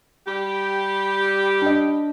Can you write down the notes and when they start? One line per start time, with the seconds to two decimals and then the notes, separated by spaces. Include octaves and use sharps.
0.27 G3 G4
1.62 D4 D#5